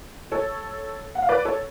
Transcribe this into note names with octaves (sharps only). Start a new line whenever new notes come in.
A4 C#5
F#5
F5
B4 D5
A4 C#5